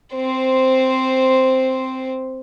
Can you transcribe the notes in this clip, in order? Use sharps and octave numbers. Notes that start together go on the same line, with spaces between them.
C4 C5